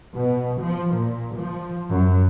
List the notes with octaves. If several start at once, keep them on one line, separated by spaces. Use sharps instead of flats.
B2
F3
A#2
F3
F#2